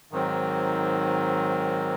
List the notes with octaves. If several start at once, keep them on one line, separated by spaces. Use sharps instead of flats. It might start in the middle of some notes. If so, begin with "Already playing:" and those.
G#2 D#3 F#3 C4